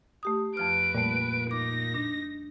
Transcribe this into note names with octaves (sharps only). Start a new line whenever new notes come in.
A3 G4 D#6
F2 F3 B4 F6 D7
A#2 G3 A3
D#4 D6 A#6
D4